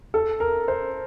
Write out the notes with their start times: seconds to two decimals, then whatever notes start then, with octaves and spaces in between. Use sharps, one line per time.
0.14 A4
0.40 A#4
0.68 C5